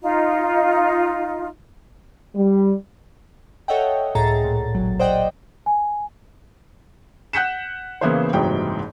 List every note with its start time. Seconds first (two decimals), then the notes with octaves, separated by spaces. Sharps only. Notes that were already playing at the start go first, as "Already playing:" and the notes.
0.02 D#4 F4
2.35 G3
3.68 A4 C#5 D#5 E5 F#5 G5
4.15 C#2 A2 G#4 A4 A#5 A6
4.44 A#2
4.75 G#1 F#3
5.00 C5 D5 D#5 F#5 G5
5.66 G#5
7.33 F#5 F#6 G6 B6 C#7 E7
8.01 C#3 E3 A#3 B3 E4 C5
8.33 F#1 C2 G#2 E3 F#3 G5